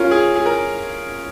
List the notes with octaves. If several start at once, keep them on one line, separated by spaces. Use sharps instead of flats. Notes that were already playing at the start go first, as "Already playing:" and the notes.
Already playing: C#4 F4 A#4
G#4
G#4
A#4